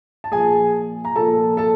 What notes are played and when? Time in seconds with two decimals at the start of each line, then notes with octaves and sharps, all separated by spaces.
0.24 A5
0.32 A#2 F3 G#4 G#5
1.05 A#5
1.16 A#2 F3 A4 A5
1.57 A4 A5